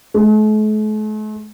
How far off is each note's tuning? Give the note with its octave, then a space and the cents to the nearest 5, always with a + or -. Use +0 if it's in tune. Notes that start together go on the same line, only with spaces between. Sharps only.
A3 -45